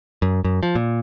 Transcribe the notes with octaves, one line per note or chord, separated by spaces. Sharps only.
F#2
F#2
F3
A#2